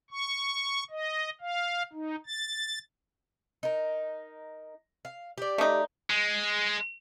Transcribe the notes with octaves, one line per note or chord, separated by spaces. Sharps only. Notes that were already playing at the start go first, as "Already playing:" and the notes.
C#6
D#5
F5
D#4
A6
D#4 A#4
F5
G4 D5
A3 D#4
G#3